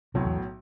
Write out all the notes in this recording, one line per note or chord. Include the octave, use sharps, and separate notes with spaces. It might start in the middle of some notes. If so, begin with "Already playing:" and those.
B1 A2 C3 F#3
E2